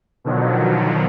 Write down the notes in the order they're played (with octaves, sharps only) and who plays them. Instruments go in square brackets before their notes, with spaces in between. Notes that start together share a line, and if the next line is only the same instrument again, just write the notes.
[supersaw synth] B2 D3 D#3 F3 F#3